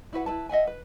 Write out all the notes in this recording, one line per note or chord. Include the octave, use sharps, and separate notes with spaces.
E4 F#4 B4 F#5
E4 B4 A5
D#5 E5 F#5 G#5
B4